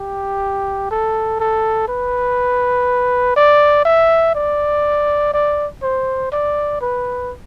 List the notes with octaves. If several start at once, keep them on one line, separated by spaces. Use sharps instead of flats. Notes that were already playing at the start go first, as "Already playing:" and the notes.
Already playing: G4
A4
A4
B4
D5
E5
D5
D5
C5
D5
B4